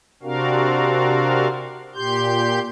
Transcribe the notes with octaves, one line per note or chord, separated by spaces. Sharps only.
C3 C4 D4 F#4 A#4 F5
A#2 G4 C6 G6